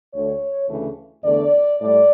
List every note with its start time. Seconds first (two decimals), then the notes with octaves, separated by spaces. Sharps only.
0.13 D2 D3 A3 C#5
0.68 D2 C#3 E3 A3
1.23 E2 D3 A3 D5
1.79 A2 G3 D5